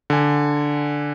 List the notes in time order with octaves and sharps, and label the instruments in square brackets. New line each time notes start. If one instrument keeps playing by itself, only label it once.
[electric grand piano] D3 G#5